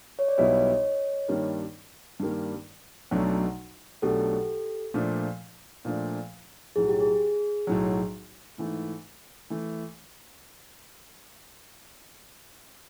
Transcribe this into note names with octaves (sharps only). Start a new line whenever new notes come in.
C#5
D5
B1 B2 G3 B3 E4 C#5 D#5
G2 D#3 G3 A#3
G2 D#3 G3 A#3
B1 B2 F#3 A3 D4
B1 B2 F#3 A3 D4 G4 A4
A#2 F3 A3 D4
A#2 F3 A3 D4
B1 A2 F#3 G#4
G4
G#4
B1 A2 F#3
G#2 E3 A3
E3 A3